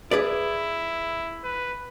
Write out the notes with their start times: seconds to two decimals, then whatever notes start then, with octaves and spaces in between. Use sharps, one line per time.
0.11 E4 G#4 B4 D5
1.44 B4